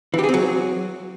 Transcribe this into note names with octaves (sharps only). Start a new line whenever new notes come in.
E3
G4
G#4
C4
F#3